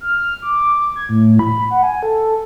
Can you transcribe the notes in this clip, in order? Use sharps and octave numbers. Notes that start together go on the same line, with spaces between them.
F6
D6
G#6
A2
B5
F#5
G#5
A4